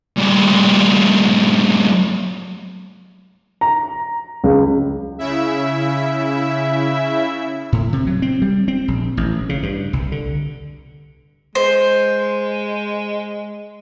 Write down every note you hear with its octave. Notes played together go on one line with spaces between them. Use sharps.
G2 A#2
A#5
C#2
C#3 E4 E5
A2
C3
F#3
C4
G3
C4
A#1
A1
C#3
G2
C2
D3
G#3 C5